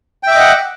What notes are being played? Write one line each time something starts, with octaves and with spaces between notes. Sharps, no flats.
D#5 E5 F#5 G5 D6